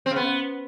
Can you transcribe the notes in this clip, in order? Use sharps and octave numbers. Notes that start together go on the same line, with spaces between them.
C4
C#3
B3